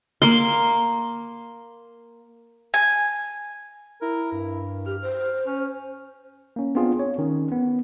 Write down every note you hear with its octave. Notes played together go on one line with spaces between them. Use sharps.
A#3 C6
G#5
E4 A#4
G2
G4 F6
C5
C#4 F6
A#3 C#4
B3 C4 D4 F4 G#4
C#5
D#3 C#4
B3